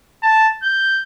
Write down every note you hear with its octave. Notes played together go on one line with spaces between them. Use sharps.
A5
G6